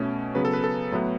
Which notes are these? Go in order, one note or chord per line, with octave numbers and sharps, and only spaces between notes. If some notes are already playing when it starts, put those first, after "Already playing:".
Already playing: B2 A3 C#4
C#3 F#3 B3 B4
A4
B4
A4
A2 F#3 B3